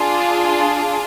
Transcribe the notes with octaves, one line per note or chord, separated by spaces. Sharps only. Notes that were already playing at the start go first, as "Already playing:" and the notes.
Already playing: D4 F4 G#4